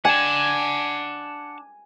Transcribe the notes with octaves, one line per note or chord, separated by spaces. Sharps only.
D4 F#5 G#5 A5